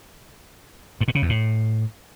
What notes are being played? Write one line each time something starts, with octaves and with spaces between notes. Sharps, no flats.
G2
A#2
C#3
E2
A2